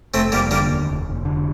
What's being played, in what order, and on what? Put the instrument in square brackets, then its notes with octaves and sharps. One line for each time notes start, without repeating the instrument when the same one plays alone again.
[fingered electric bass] F1 [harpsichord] A3 C4
[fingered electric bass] F1 [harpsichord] G3 A#3
[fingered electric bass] D3 [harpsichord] G3 A#3
[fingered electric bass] D#2
F1
F1
D3